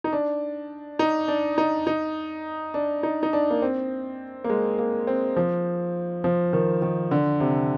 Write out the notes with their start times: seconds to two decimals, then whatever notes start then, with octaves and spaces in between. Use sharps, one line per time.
0.04 D#4
0.12 D4
0.99 D#4
1.28 D4
1.58 D#4
1.87 D#4
2.74 D4
3.03 D#4
3.23 D#4
3.33 D4
3.50 A#3
3.62 C4
4.44 A#3
4.50 G#3
4.79 A#3
5.07 C4
5.37 F3
6.24 F3
6.53 D#3
6.82 D#3
7.11 D3
7.40 C3